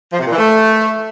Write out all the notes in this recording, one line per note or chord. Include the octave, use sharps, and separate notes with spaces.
F3
C3
A#2
E3
A3